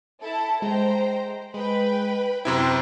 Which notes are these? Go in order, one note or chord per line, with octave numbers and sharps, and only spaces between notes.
E4 A4 A5
G#3 C5 G5 A#5
G#3 B4 G5 B5
F#2 C3 E4 C5 G5 C6